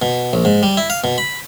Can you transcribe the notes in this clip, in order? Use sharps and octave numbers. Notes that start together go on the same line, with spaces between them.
B2
A#1
G#2
G3
E4
F5
B2
B5